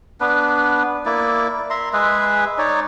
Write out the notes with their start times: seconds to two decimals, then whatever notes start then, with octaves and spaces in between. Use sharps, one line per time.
0.21 B3 D4 B4
1.06 A#3 E4 D5
1.70 E5 A#5 C6
1.93 G#3 G#4 B4 E5
2.58 D#4 C#5 D5